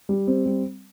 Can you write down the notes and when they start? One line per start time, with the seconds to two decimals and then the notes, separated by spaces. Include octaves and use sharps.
0.09 G3
0.27 C4
0.46 G3